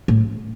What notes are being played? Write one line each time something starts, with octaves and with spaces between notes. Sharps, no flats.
A2